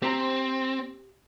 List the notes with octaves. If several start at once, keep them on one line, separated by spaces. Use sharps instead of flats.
C4 G4 C5 A#5